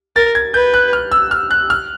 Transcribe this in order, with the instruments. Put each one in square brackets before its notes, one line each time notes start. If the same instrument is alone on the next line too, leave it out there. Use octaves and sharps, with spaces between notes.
[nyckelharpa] A#4 [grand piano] A6
[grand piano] G#6
[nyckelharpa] B4 [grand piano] G6
[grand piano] F#6
F6
E6
F6
F#6
F6